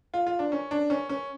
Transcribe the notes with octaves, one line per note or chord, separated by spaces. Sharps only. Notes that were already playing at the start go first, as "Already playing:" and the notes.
F4
F4
D4
C#4
D4
C#4
C#4